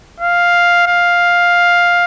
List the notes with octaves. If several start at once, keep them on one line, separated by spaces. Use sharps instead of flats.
F5
F5